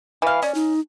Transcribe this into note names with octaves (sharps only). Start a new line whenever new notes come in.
E3 F5
C#4 D5
D#4